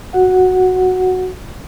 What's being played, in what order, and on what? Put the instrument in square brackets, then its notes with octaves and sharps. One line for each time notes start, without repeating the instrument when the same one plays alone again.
[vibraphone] F#4 F#5